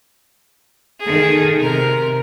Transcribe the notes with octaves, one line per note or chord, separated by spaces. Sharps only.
D#3 A3 G#4
C3 A#4